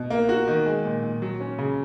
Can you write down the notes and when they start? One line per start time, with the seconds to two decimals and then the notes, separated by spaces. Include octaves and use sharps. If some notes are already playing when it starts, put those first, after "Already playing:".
Already playing: B2
0.10 A#3
0.29 F#4
0.48 D#3
0.66 G#3
0.85 A#2
1.03 A#2
1.22 F#3
1.40 C#4
1.58 C#3